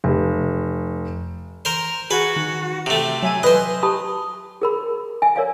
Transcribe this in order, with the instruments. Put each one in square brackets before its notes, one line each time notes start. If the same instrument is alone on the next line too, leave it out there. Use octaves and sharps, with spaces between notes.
[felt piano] F1
[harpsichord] A#4 C5
[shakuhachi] F#4 [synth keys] G#4 G#6 [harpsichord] B4
[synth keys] D#3
[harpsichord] C3 A3 [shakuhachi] G5
[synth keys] F#3 E5 D#7 [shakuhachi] G#5
[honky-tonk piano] B4 [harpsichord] C5 D#5
[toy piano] G4 A5 B5 D#6
G#4 A#4 B5
E5 G#5
A#4 C#5 D5 E5 F5 G#5